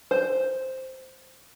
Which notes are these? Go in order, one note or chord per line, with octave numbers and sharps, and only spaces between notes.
C5